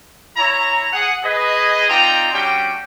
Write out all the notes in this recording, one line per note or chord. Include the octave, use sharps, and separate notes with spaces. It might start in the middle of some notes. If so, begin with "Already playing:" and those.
E4 C#5 A#5
G#4 F#5
G#4 B4 D#5
C4 D#4 F4 D5 G5 A#5
G3 C#4 D4 F#4 G4 G5